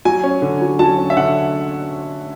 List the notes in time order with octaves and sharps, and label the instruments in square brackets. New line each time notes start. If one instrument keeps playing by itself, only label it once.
[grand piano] F#3 G#5
C#4
D3
F#3
F#3 A5
C#4
E5
D3 F#5